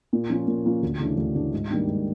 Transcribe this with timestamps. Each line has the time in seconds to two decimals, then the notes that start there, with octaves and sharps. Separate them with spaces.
0.13 A#2
0.30 F3 A#3 C#4 F4
0.47 A#2
0.65 F3 A#3 C#4 F4
0.82 D2
1.00 C#3 E3 A3 D4
1.18 D2
1.35 C#3 E3 A3 D4
1.52 G#2
1.70 D#3 G3 A#3 D4
1.88 G#2